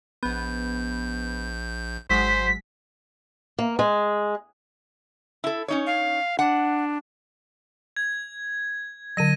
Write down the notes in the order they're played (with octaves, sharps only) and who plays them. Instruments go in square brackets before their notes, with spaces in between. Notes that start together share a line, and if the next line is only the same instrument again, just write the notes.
[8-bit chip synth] A#1 G6 [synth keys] B3
[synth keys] G#1 F#3 G#3 [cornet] C5 [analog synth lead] B6
[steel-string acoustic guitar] A#3
G#3
[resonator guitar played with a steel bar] E4 A4
C#4 D#4 C#5
[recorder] F5
[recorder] D4 [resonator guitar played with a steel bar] F#5
[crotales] G#6
[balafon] D3 F#3 [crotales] A#6 D#7